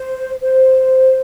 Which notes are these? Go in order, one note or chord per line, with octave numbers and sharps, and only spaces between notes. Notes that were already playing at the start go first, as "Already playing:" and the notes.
Already playing: C5
C5